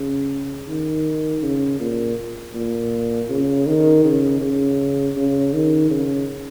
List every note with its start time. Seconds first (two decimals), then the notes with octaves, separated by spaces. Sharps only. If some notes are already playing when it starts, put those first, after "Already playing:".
Already playing: C#3
0.68 D#3
1.43 C#3
1.80 A#2
2.55 A#2
3.30 C#3
3.66 D#3
4.05 C#3
4.42 C#3
5.16 C#3
5.53 D#3
5.91 C#3